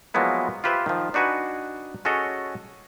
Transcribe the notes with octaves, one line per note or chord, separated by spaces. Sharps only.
F3 F#3 G#3 A#3 B3 E4
F4 G4 B4 C5 E5
D#3 F3
D4 D#4 F#4 B4 G#5
C#4 F#4 G#4 A4 C#5 D#5